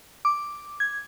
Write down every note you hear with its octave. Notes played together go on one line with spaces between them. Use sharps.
D6
G#6